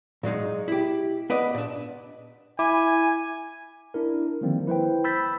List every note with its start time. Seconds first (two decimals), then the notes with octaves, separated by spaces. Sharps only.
0.23 A#2 F#3 G#3 D#4
0.68 E4 G4
1.30 B3 B4 D5 D#5 F#5
1.55 A#2 D4
2.59 E4 G#5 D6
3.94 D4 E4 A#4
4.41 D3 D#3 F3 G3 A#3 C4
4.67 E4 B4 C5 G5
5.04 B5 E6 G6 A6 B6